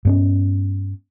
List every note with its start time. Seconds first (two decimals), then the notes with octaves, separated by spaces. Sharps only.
0.05 G2 B3 C#4